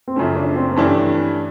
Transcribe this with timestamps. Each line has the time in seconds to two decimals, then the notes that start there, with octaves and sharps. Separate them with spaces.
0.08 C4
0.16 F#2 C#3 F3 A3 C#4
0.35 D4
0.56 C4
0.71 C4
0.76 G2 E3 A3 C#4 D4 G4